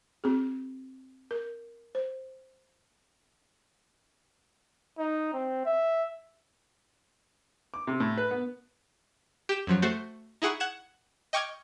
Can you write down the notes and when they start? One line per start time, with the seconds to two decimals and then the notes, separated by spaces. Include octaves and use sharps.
0.24 C4 F#4 G#4
1.31 A#4
1.95 C5
4.98 D#4
5.33 C4
5.66 E5
7.74 D6
7.87 C3
8.00 A2
8.17 B4
8.31 B3
9.49 G4 E7
9.67 F#2 F3 F#3
9.82 A3 F#4 C5
10.42 D#4 E4 G#4 F#5 C#6
10.60 F#5 G#6 E7
11.33 D#5 G5 C#6 D6 F6 G#6